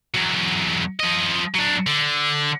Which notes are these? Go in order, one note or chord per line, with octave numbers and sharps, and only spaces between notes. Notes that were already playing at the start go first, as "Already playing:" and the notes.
E2 F#3
F3 D#5
F#3 D4
D3